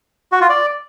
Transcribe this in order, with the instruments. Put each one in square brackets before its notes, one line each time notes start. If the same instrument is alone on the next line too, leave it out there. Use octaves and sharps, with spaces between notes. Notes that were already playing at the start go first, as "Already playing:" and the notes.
[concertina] F#4
F4
D5